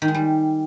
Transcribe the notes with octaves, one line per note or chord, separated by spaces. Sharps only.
D#3
G#3
G3